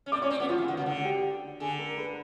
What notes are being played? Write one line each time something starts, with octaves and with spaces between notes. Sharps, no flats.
C#4
C4 D5 D6
C#4 C#5 C#6
C4
B3 F#4 F#5
F3 F4 F5
E3
D#3 F#4 F#5
C#3
D3 F#4 F#5
G4 G5
D3 G#4 G#5
A#4 A#5
B4 B5